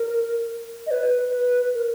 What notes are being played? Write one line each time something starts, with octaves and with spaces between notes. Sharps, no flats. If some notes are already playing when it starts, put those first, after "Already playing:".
Already playing: A#4
D#5
B4
B4
A#4